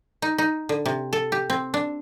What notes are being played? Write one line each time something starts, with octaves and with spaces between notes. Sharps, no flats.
D#4
D#4
D3
C3
A4
G4
C4
D4